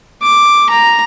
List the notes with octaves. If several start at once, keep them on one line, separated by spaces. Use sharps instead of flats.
D6
A#5